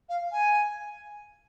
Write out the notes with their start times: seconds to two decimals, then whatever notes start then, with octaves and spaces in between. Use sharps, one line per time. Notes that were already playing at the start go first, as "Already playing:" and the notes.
0.09 F5
0.32 G#5